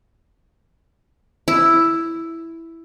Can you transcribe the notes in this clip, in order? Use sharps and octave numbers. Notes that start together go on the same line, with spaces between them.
E4